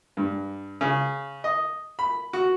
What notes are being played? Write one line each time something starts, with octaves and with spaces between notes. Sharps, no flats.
G2
C#3
D#5
B5
F#4